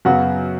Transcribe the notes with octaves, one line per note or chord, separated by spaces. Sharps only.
F#2 C#3 F#3 B3 F#4